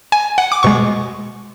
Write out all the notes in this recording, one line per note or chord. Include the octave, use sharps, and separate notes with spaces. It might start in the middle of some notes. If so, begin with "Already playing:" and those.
G#5
F#5
D6
B2 G#3 C#6